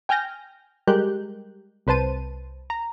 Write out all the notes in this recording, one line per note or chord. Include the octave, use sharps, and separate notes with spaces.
G5 G#5 F6 G6 A#6
G3 G#3 G4 A#4 F#6 G6
C2 B4 C5 A5 D#7
A#5